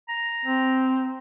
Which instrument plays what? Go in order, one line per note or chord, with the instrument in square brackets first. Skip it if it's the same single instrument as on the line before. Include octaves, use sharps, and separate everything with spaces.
[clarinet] A#5
[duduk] C4